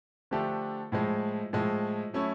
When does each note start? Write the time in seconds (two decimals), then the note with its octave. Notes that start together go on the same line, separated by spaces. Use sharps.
0.31 D3 F3 A3 D4 G4
0.92 A2 F3 G#3
1.53 A2 F3 G#3
2.13 F#3 A3 C#4 E4